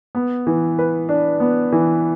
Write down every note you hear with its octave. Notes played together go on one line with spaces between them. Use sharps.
B3
E3
B4
D4
B3
E3